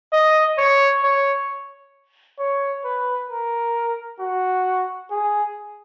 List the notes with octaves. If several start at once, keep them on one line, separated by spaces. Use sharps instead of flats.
D#5
C#5
C#5
C#5
B4
A#4
F#4
G#4